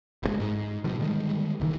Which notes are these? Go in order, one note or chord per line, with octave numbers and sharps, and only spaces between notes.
F#1 A#2 G#3
G#2
B2 D3 F3 G3
D3 D#3 G3 G#3
D#1 D2 D#3 E3